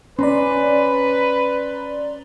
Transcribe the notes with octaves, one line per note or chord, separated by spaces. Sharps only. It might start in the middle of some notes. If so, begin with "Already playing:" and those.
C#4 B4 D5 A#5 C6